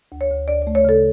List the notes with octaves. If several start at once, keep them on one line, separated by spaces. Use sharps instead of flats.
D2
C#5
D2
D2 D5
A3 D5
C#5
C#3 A4